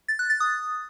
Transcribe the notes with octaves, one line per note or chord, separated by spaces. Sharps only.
A6
F#6
A6
D#6